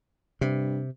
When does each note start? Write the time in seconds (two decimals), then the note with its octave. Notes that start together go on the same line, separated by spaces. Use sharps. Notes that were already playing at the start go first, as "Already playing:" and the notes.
0.41 G2 C3